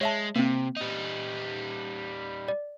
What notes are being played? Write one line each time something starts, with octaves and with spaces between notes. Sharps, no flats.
G#3 C#5 E5 A5
C3 A#3 C4
G3 D#4
D5